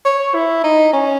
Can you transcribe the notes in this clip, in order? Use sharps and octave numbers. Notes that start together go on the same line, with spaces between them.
C#5
E4
D#4
C#4